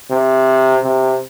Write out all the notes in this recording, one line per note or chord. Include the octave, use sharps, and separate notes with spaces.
C3
C3